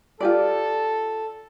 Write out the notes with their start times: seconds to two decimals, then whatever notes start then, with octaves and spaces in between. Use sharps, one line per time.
0.20 F4 G4 A4 D5